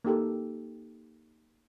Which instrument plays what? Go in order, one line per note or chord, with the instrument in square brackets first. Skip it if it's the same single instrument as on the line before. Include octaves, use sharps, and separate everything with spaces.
[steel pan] A#3 D#4 G4 A4